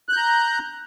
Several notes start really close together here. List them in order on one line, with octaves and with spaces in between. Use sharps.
F#6 G6 A#5